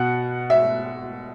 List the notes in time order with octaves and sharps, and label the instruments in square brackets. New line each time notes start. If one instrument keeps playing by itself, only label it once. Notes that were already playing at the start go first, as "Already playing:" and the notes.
Already playing: [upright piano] B2 F#5
E5